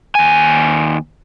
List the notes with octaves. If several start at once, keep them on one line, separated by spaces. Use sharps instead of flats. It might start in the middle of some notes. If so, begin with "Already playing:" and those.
D#2 G#5